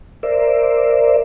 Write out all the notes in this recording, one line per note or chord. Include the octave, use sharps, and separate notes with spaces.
A#4 C5 D5 E5